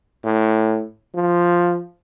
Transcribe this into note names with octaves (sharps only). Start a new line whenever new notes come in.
A2
F3